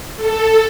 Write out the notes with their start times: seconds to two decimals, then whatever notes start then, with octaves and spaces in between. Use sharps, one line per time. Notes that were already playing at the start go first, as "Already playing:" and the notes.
0.16 A4